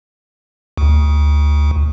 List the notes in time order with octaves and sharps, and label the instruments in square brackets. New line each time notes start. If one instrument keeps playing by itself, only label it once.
[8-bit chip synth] D2